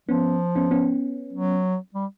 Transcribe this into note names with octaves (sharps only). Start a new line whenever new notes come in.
F3 B3 C#4
B3 C#4
B3 C#4
F#3
G3